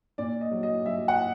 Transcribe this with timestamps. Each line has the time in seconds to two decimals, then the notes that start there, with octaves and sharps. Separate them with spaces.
0.18 A#2 D5
0.41 D#5
0.51 F#3
0.63 D#5
0.86 F#3 E5
1.08 F#5